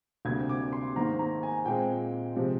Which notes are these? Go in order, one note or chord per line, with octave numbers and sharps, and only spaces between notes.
D2 C3 G3 A#3 G#6
D6
C6
G#2 D#3 A#3 A#5
A#5
G#5
A#2 G#3 C4 G5
C3 F3 G#3 C4